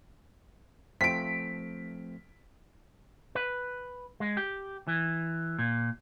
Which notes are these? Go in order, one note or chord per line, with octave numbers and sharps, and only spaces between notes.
F3 A3 C4 B6 D7
B4
G#3
G4
E3
A#2